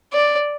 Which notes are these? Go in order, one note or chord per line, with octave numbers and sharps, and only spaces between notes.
D5